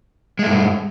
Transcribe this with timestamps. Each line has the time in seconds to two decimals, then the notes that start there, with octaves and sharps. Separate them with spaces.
0.39 G#3
0.43 A3
0.47 G2